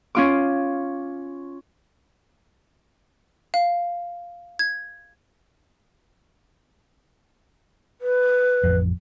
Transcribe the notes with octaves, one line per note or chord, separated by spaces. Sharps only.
C#4 F4 D6
F5
G#6
B4
A1 F2